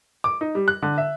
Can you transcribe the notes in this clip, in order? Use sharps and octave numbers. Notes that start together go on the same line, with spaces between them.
D6
D#4
G3
F#6
D3
E5